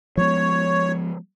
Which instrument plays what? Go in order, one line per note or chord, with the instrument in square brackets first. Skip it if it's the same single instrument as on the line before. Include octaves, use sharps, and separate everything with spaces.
[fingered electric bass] F3 G#3 B3 [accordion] C#5